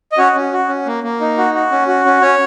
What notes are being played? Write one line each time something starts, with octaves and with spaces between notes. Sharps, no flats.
D#5
C#4 F#4 C#5
C#4
F#4
C#4
A#3
A#3
D#4
F#4
F#4
C#4
F#4
C#4
C#4 C#5